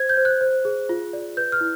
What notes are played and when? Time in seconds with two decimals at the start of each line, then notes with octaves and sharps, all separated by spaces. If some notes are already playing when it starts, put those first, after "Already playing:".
Already playing: C5 G#6
0.09 G6
0.17 C5
0.25 F#6
0.41 C5
0.65 G#4
0.89 F4
1.13 D5
1.37 B4 G6
1.52 F6
1.61 E4